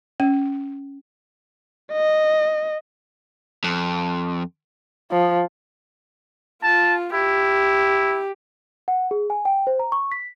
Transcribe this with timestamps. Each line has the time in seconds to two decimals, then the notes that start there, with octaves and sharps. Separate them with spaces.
0.20 C#4
1.93 D#5
3.64 F2
5.11 F3
6.63 F4 A5
7.13 E4 G4
8.88 F#5
9.11 G#4
9.30 G#5
9.45 G5
9.67 C5
9.79 A#5
9.92 C#6
10.12 B6